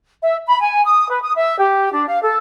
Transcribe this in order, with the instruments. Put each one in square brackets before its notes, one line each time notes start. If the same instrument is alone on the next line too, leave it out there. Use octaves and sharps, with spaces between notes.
[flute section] E5
B5
G#5
D#6
B4
D#6
E5
G4
D4
F5
A4